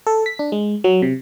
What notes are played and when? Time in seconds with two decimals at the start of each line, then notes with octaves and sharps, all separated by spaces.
0.07 A4
0.26 B6
0.39 D4
0.52 G#3
0.84 F#3
1.02 C3